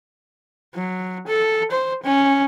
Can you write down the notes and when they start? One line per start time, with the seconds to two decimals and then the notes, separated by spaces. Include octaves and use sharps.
0.75 F#3
1.27 A4
1.71 C5
2.03 C#4